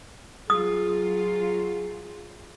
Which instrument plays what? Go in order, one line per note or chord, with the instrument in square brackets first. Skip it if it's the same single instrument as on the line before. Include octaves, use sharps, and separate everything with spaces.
[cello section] F#3 F4 [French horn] G#4 [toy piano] D#6